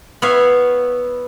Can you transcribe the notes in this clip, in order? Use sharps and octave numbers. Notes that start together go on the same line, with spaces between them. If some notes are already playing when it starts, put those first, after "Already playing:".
B3 E4 B4 C#5 E5 F5